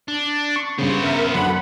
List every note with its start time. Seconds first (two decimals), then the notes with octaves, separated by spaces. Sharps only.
0.08 D4
0.56 C#6
0.79 G2 C#3 B3 C5
1.04 A#4 E5
1.34 F#2 D3 F#3 F#5 B5